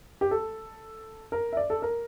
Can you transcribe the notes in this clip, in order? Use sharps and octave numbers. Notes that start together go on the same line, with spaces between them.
G4
A4
A#4
E5
D5
A4
A#4